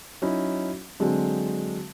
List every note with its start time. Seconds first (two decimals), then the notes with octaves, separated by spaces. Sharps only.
0.22 F#3 C#4 D#4 E4
1.00 D3 F#3 G#3 C4